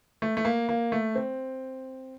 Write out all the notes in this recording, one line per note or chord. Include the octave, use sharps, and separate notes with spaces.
A3
A3
A#3
A#3
A3
C4